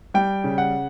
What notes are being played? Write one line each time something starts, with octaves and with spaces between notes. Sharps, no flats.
G3 G5
C#3
F#5